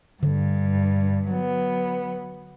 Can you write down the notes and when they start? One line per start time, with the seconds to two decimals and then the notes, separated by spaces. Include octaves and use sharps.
0.23 G2 D3
1.28 F#3 B3